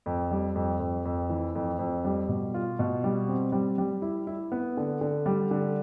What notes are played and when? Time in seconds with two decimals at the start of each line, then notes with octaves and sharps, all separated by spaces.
0.06 F2
0.31 G3
0.55 F2
0.80 F2
1.05 F2
1.29 E3
1.55 F2
1.79 F2
2.05 G3
2.29 B2
2.54 F4
2.79 B2
3.04 G3
3.28 C4
3.52 G3
3.78 G3
4.02 E4
4.27 E4
4.52 B3
4.77 D3
5.01 D3
5.26 G3
5.51 D3